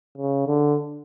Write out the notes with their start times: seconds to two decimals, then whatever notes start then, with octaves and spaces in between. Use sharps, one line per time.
0.18 C#3
0.47 D3